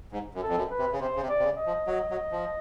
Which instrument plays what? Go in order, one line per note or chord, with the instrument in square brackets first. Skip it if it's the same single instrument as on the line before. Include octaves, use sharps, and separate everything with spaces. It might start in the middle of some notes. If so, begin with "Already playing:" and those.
[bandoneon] G#2
F#2
[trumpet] A4
[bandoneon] F2
F#2
[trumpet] B4
[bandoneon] C3
C#3
[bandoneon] C3 [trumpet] C5
[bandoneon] C#3
C3
[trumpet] D5
[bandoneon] C3
C#3
[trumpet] D#5
[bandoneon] F3
F#3
F#3
F3